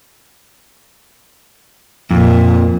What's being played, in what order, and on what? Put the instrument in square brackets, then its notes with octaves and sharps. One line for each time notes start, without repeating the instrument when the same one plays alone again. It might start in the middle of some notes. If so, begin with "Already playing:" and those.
[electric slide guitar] F2 [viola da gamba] A#2